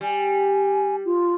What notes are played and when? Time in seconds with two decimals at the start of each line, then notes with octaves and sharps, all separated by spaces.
0.01 G3 G#5
1.05 F4